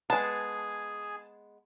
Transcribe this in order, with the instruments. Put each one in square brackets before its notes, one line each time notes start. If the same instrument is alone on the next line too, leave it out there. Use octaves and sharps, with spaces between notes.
[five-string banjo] G#3 B3 [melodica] G#4 G#5 [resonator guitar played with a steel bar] A5